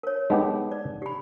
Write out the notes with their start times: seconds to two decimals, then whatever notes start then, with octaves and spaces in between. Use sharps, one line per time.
0.03 A#4 C#5
0.30 G#3 B3 D#4 G4
0.71 D5
1.02 G4 B5